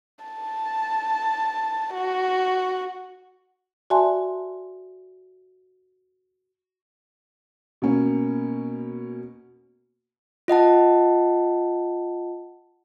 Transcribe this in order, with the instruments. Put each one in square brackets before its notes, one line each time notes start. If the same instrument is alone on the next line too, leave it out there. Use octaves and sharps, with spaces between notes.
[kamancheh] A5
F#4
[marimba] F#4 D5 E5 G#5 A5 C6
[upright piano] B2 A#3 C#4
[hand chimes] F4 D#5 F#5 A5